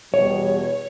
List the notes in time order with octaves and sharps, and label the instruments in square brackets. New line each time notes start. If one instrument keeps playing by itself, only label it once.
[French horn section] E2 B2 G3 [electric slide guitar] C#5